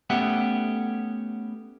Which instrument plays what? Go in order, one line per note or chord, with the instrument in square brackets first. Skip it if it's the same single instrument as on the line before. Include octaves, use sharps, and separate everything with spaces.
[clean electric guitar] A3 B3 C#4 G4 E5 F#5